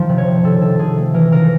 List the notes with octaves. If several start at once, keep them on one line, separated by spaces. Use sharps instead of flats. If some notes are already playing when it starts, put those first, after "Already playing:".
Already playing: D#3 F3
C3
C#5
C3
C3 A4
C3 A4
C3 G#4
A3
E3 A#4
C#3 A#4